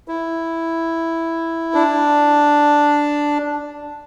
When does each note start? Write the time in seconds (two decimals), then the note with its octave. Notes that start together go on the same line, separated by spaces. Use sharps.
0.08 E4
1.74 D4